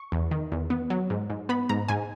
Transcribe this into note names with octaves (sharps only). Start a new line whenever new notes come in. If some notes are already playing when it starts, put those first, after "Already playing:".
Already playing: C#6
E2
D#3
E2
B3
F#3
G#2
G#2
B3 B5
G#2 A#5
G#2 G#5